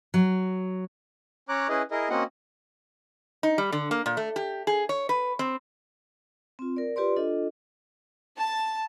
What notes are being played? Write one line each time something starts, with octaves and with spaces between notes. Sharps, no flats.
F#3
C#4 C#5 A#5 D6 F#6
C#4 E4 G#4 B4 D#5
E4 G#4 A#4 D#5
A#3 C4 C#4 F#4 D#5 F#5
D#4
G3
D3
A#3
A#2
A3
G4
G#4
C#5
B4
C4
C4 F4
A#4 D5
F4 G4 B4 D5 C6
D4 F4 A4 D#5
A5